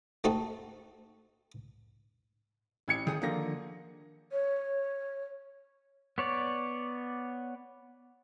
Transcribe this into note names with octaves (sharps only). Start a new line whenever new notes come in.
A3 C4 D#4 F#4 A4
A1 G#6 C#7
D#3 G#4 G5
D3 D#3 F3 A#3 A#6
C#5
B3 C#5 D5